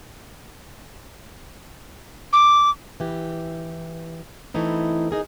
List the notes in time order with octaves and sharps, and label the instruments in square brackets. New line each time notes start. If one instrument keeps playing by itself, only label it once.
[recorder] D6
[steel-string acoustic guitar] E3 G4
E3 A3 C4 D#4 E4
D#4 G#4 A#4